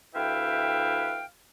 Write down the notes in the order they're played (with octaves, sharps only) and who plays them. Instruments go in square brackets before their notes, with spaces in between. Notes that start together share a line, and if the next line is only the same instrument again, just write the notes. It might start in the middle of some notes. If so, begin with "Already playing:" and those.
[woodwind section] D2 E4 B4 E5 F5 G5